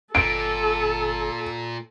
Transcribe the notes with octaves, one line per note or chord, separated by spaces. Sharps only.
G1 A#2 A4 D7